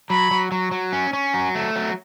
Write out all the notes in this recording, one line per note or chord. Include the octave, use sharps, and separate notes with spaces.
F#3 B5
F#3
F#3
F#3
C#4
C#4
F#3
A3
F#3